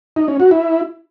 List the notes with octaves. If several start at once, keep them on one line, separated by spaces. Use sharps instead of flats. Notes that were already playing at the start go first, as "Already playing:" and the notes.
D#4
C#4
F#4
E4